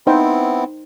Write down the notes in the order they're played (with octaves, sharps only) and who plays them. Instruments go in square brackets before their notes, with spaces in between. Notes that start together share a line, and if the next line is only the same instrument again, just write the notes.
[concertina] B3 C4 E4 [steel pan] D#4 C5 G5